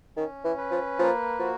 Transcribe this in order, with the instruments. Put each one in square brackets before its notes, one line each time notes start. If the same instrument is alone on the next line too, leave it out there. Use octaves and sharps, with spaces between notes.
[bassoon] D#3 [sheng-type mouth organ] C#4
[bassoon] E3
[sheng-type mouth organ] B4
[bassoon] F3
[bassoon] F3 [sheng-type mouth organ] A#3
[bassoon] F3 [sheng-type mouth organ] F#4